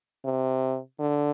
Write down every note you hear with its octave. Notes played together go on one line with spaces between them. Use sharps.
C3
D3